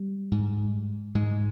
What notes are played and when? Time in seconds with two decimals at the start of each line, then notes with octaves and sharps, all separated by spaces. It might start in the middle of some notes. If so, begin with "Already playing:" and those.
Already playing: G3
0.32 G#2
1.15 G#2 G#3